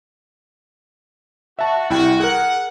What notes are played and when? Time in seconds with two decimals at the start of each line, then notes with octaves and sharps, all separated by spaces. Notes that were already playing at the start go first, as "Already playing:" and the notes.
1.59 F#4 E5 A5
1.90 C2 E4 F#4 G5
2.20 G#4 A#4 F#5